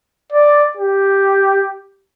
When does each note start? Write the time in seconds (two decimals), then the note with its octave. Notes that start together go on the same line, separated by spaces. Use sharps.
0.32 D5
0.77 G4